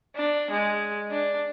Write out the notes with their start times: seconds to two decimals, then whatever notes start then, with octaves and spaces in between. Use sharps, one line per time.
0.16 D4
0.51 G#3
1.10 D4